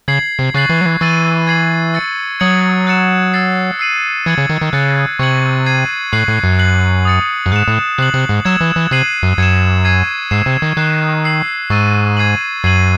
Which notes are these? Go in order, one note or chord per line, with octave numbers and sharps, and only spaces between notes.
C#3 G#6 C7 F#7
C3
C#3 C#6 F#6 A6 C7 F#7
E3
F#3
E3
E3 C#6 E6 A6 D#7 F#7
G#6 C7 F#7
E6 A6 C#7
F#3 D#6 G#6 C#7 F#7
F#6 A6 C#7 E7
E6 A6 C7
E6 C7 D#7 F#7
E3 G#6 C#7 F#7
C#3
D#3
D#3
C#3 F#6 A6 C#7
C3 C#6 G#6 C#7 F#7
G#6 C7 D#7
A2 C#6 F#6 C7 F#7
A2
F#2
F#6 C7 F#7
D#6 A6 C#7
F#2
G#2 F#6 C#7 E7
A2
C3 F#6 C7 F#7
C3
G#2
F#3 E6 G#6 C#7 E7
E3
E3
C3 G#6 C7 D#7 F#7
F#2
F#2 G#6 C#7 E7
C#6 E6 G#6 C7 D#7
G#2 E6 C7 E7
C3
D#3
D#3 F#6 C7 E7
E6 C7 F#7
G#2 C#6 E6 A6 D#7
G#6 C7 D#7 F#7
F#2 G#6 C7 D#7 F#7